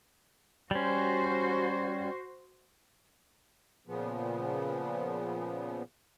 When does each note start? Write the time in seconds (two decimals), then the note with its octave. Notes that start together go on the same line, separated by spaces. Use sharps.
0.71 G3 C#4 F#4 C5
3.87 A#2 C#3 F3 B3